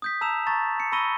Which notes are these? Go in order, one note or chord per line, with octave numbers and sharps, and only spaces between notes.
D#6 G6 B6
A5 A#5 E6 G6 E7 F7
A5 A#5 C#6 A6
C#7
B5 C#6 E6 A#6 D#7 G7